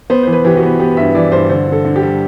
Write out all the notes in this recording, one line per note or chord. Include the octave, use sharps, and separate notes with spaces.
B3 C5
E3 C5
B4
E3 G4
F#4
B3
B3 G4
G2 E5
E3 D5
G2 C5
D3 C5
D3 A4
D3
G4
G3